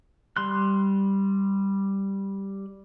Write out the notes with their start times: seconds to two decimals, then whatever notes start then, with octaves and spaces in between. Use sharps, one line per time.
0.37 G3 C6 F#6